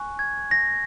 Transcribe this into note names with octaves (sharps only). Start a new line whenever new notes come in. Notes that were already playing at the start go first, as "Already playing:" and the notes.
Already playing: G#5 C#6 F#6
G#6
A#6